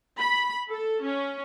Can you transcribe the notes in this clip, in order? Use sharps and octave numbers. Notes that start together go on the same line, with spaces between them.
B5
A4
C#4